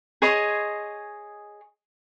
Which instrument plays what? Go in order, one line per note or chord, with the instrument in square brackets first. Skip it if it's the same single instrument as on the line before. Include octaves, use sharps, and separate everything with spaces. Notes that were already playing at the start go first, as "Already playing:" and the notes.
[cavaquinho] G#4 C#5 D#5 C6